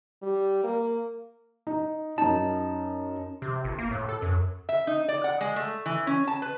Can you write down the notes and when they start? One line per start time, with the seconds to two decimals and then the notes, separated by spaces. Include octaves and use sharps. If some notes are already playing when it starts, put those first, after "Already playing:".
0.22 G3
0.63 A#3
1.67 D#4
2.18 F#2 D#4 A5
3.42 C3
3.64 G1
3.78 A#3
3.91 A2
4.09 A4
4.22 F#2
4.69 E5
4.87 D#4
5.08 D5
5.24 F#5
5.41 G#3
5.56 A3
5.86 E3
6.07 C#4
6.27 A5
6.42 B4